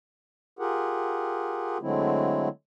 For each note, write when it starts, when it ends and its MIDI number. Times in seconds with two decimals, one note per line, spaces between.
0.59 1.78 65
0.59 1.78 67
0.59 1.78 68
0.59 1.78 70
0.59 1.78 78
1.82 2.49 50
1.82 2.49 54
1.82 2.49 56
1.82 2.49 57
1.82 2.49 60
1.82 2.49 64